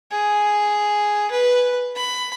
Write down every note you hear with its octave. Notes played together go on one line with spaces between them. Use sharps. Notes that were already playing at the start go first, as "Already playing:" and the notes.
G#4
B4
B5